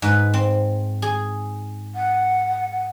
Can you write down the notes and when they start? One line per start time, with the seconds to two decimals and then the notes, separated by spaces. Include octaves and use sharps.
0.02 G#2 B4
0.34 C4
1.02 G#4
1.95 F#5